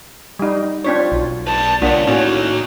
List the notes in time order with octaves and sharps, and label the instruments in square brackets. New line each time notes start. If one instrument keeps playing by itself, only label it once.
[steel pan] G3 D#4
[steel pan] C4 D4 C#5 [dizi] F4
[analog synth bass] B1
[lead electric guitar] B4 D5 [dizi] A5
[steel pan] A#3 D4 [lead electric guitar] F4 C#5 [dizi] F#5
[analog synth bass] A2 [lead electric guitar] A#3 D#4 [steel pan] C#4 [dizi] F#4